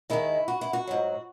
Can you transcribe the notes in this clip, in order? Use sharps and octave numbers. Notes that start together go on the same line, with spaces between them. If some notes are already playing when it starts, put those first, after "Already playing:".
D#2 D#3 G#3 E4
F#4
E4
F#4
G#2 F#3